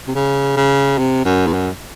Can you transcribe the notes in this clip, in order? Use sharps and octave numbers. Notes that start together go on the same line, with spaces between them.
C3
C#3
C#3
C3
F#2
E2
F#2